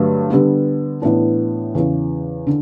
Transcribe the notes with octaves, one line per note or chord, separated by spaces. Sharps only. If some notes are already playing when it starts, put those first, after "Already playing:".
Already playing: G2 D3 F#3 A3
D3 G3 B3
A2 E3 B3 D4
E2 C#3 E3
D3